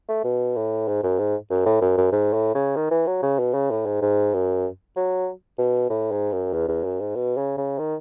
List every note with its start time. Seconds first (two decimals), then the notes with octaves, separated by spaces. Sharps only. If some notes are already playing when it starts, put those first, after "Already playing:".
0.09 A3
0.24 B2
0.56 A2
0.88 G#2
1.03 F#2
1.19 G#2
1.51 F#2
1.66 A2
1.81 F#2
1.98 F#2
2.12 G#2
2.33 A2
2.55 C#3
2.76 D#3
2.91 E3
3.07 F#3
3.23 C#3
3.39 B2
3.54 C#3
3.71 A2
3.86 G#2
4.02 G#2
4.34 F#2
4.97 F#3
5.59 B2
5.90 A2
6.12 G#2
6.32 F#2
6.54 E2
6.69 E2
6.84 F#2
7.00 G#2
7.16 B2
7.37 C#3
7.57 C#3
7.79 D#3